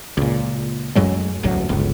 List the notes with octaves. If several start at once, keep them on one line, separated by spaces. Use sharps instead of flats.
C#2 A#2
F#2 A2 F#3 G#3
E1 A1 D2 F#3
G1 C#2